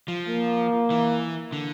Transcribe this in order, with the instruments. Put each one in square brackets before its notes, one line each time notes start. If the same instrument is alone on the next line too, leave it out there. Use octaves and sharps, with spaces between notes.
[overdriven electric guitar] F3
[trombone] A#3
[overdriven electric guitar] E3
D3